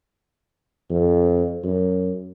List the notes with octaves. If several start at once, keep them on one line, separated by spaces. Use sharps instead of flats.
F2
F#2